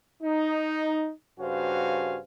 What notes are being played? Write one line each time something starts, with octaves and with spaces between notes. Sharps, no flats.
D#4
G2 C#3 F#4 C5 F5 G#5